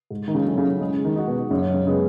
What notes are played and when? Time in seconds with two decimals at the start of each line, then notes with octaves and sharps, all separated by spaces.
0.11 G#2
0.28 D#3
0.35 C#3
0.45 F#3 C#4 E4 A4
0.58 C#3
0.81 C#3 G#3
1.05 D#3
1.16 D#4 F#4
1.27 B2
1.50 F#2 C#3
1.74 C#3
1.86 C#3 G#3 B3